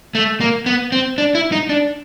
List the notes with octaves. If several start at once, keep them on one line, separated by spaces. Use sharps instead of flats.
A3
A#3
B3
C4
D4
E4
D#4
D4